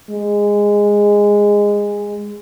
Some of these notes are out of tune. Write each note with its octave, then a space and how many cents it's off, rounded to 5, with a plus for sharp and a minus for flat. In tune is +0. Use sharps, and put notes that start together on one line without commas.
G#3 -15